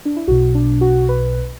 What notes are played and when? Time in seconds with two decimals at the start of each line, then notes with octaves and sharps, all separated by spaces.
0.05 D4
0.16 E4
0.28 B1 B2 F#4
0.55 D4
0.81 F#4
1.09 B4